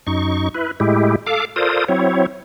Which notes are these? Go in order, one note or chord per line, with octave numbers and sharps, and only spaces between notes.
F#2 D#4 C#6
E4 B4
A2 G#3 E4 G4
A4 F5 D6
F4 A4 A#4 C5 D5 D#6
F#3 C4 E4 C#5